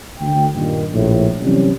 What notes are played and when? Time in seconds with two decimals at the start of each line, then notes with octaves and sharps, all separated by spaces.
0.19 D2 G5
0.54 G2 A#2 D#3
0.92 A#1 A2
1.42 C3 E3 F#3 G3 C4 C#4